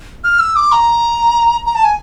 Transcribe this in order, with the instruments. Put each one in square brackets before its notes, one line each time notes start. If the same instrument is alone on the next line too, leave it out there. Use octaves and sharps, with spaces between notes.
[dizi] F6
E6
D6
A#5
A#5
A5
G#5